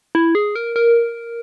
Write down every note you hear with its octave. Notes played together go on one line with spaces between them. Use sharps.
E4
G#4
A#4
A#4